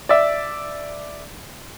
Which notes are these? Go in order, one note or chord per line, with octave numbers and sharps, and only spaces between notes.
D5 E5